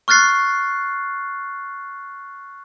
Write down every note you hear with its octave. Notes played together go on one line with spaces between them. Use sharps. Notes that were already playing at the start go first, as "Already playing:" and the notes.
C#6 F6 F#6 A6 C7